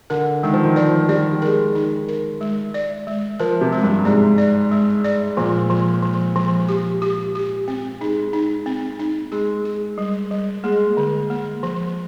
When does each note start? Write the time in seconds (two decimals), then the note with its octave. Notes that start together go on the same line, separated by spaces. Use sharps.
0.10 D3 A#4
0.43 D#3 G#3
0.54 F3
0.64 D#3
0.76 F3 D5
1.09 G3 D5
1.42 G#3 A#4
1.75 D#4
2.08 A#4
2.41 G#3
2.74 D5
3.07 G#3
3.40 F3 A#4
3.61 C3
3.72 G#3
3.83 G2
4.05 G#2 D5
4.38 D5
4.71 G#3
5.04 D5
5.37 A#2 F3
5.70 F3
6.02 F3
6.36 F3
6.69 G4
7.02 G4
7.35 G4
7.68 C4
8.00 G#3 D#4
8.33 D#4
8.66 C4
9.00 D#4
9.32 G#3 G#4
9.65 G#4
9.98 G3
10.31 G3
10.64 G#3 A#3
10.97 D3
11.30 A#3
11.63 F3